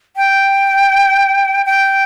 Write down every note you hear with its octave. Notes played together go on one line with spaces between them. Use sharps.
G5
G5